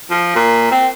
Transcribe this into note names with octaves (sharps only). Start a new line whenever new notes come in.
F3
A#2
C4